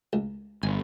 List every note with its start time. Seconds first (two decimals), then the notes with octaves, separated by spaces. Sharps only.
0.13 C#2
0.63 G1 G#5